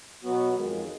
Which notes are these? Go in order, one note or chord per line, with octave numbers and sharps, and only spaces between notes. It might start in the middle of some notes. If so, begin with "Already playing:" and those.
B2 F#3 B3 F#4
F2 D#3 G#3